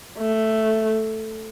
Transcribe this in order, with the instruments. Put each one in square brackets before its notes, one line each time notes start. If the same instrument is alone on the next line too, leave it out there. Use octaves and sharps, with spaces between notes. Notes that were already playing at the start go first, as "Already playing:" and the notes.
[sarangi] A3